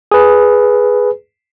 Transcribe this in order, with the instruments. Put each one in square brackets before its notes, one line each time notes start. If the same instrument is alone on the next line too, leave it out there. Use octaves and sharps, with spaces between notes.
[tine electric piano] G#4 B4